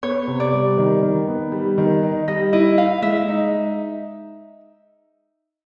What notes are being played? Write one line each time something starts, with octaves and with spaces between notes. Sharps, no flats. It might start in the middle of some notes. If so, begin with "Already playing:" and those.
B3 C#5
C3
D5
G3
D#3
D#3
B3
G3
D#3
D#4
G3 D#5
E4 D#5
E4 F5
G#3 E5
D#4